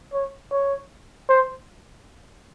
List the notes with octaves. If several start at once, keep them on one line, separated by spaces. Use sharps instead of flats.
C#5
C#5
C5